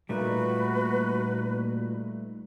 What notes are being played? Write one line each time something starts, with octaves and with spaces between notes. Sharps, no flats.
A#2 G3 A3 D#4 F#4 B4